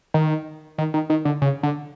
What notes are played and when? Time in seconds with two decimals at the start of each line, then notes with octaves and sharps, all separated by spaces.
0.14 D#3
0.78 D#3
0.94 D#3
1.10 D#3
1.25 D3
1.42 C#3
1.63 D3